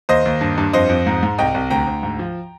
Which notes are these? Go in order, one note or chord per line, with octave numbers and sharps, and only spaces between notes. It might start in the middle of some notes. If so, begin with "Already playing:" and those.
D#2 C5 D#5
D#2
G2
G2
F2 C5 D#5
F2
G#2
G#2
C2 D#5 G5
C2
D2 G5 A#5
D2
G#2
F3